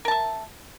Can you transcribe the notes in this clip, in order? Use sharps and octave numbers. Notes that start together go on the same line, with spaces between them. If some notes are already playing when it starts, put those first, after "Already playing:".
A#4 E5 A5